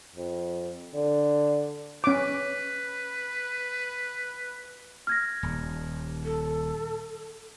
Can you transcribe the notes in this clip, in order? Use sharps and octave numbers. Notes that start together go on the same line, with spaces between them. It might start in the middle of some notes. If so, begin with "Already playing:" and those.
F2
D3
C#4 B4 D6
F6 G#6 A#6
D#1
A4